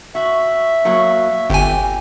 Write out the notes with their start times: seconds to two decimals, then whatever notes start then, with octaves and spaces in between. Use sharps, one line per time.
0.15 F#4 E5
0.85 F#3 A#3
1.50 G1 G4 G#5